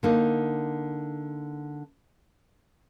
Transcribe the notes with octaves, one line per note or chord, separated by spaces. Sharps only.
D3 A#3 D#4